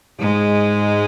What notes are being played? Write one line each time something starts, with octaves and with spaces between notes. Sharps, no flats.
G#2 G#3